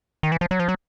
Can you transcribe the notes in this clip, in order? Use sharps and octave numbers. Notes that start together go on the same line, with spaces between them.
D#3
E3
F3
F#3
F3
F#3